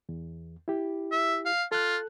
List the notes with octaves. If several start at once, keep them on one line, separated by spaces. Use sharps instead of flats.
E2
E4 G4
E5
F5
F4 A4 F#6